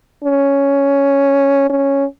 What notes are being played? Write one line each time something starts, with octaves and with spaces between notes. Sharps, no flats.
C#4
C#4